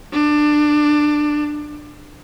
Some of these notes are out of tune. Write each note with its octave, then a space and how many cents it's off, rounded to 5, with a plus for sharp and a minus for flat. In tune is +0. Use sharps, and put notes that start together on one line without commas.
D4 +20